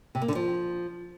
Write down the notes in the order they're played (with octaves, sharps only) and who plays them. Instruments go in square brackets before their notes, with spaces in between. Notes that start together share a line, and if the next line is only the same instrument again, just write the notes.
[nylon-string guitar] C3
A#3
D3
F3